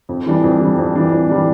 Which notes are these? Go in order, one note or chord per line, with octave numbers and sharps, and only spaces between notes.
F2
E3 G3 D4
F2
E3 G3 D4
F2
E3 G3 D4
F2
E3 G3 D4